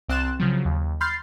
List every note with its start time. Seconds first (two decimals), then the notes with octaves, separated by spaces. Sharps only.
0.09 C2 C4 C6 F#6 A6 E7
0.40 C#3 F3 F#3
0.65 D#2
1.01 B5 C6 F6 G6 A6 C7